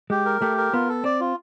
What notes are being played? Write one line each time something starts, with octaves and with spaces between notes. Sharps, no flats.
G#3 G4
A#4
A3 G4
A#4
B3 F4
A4
C4 D5
F4